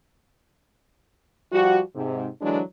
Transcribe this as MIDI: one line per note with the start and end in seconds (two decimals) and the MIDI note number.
1.52 1.80 53
1.52 1.80 55
1.52 1.80 66
1.95 2.27 44
1.95 2.27 48
2.41 2.61 50
2.41 2.61 52
2.41 2.61 54
2.41 2.61 56
2.41 2.61 62